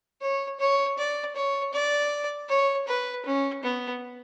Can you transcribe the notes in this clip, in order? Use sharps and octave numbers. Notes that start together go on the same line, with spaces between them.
C#5
C#5
D5
C#5
D5
C#5
B4
C#4
B3